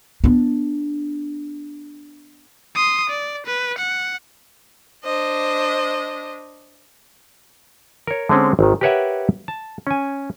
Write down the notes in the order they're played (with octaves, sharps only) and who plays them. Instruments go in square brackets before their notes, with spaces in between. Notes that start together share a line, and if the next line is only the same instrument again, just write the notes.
[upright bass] B3 D4
[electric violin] C6 D#6
D5
B4
F#5
[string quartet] D4 C5 D#5
[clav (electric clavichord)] A#4 C#5
D3 G#3 C4 C#4
G#1 D#3
G4 A#4 B4 C#5 E5 F#5
A5
C#4 G#5